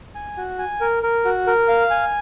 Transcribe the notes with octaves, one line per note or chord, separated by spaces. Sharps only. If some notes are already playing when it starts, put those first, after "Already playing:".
G#5
F#4
G#5
A#4
A#4
F#4
A#4
F5
G#5